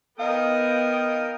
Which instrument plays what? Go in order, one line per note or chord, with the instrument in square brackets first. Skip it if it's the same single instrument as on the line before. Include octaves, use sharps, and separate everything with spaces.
[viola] B3 G5 [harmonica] A#4 D#6 [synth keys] D#5 F5